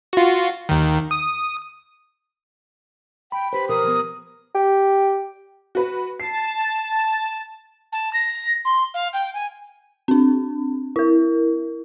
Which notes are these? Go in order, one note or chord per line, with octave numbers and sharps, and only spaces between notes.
F4 F#4
D#2 D#3
D#6
G5 B5
G4 B4 C5 B5
B2 F3 A#4 D#6
F3 B3
G4
F#4 B4
A5 C7
A5
A#6
C6
F5
G5
G#5
C4 D4
E4 A#4